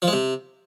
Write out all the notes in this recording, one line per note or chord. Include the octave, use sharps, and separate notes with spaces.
F3
G#3
C3